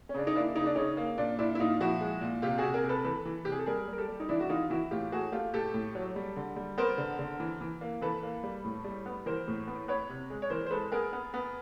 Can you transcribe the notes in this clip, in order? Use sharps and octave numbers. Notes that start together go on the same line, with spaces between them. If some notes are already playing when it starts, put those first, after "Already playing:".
C#4
C#3 D4
D#4
A#3 D4 E4
C#3 D#4
D4
C#3 C#4 D#4
A#3
A#2 D4
A#2 D4 E4
E4
A#2 D#4 F4
F3 E4 F#4
G#3
A#2
C3 F4 G4
C3 F#4 G#4
G#4 A#4
C3
A4 B4
E3 A4 B4
E3
C3 G4
G#4
A4
G3 G#4 A#4
G3 A#4
G4 A4
G3
D#4
E3 D4 E4
F#4
E3 D#4 F4
E3 E4 F#4
A2 F4 G4
A3 F#4 G#4
A3 F4 G4
A2 G4 A4
A2
F#3
G3
D3
G3
B3 A#4 C5
D3
D3
E3
E3
A#3
E3 A4 B4
A#3
G3
A2
G3
B3
E3 A#4 C5
A2
B3
B3 B4 C#5
C3
G#3
C#5
E3 A#4 C5
C5
G#3 A4 B4
B3 G#4 A#4
B3
B3